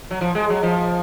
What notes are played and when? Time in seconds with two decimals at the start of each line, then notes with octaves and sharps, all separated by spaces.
0.11 F#3
0.21 F3
0.35 G#3
0.50 F#3
0.63 F3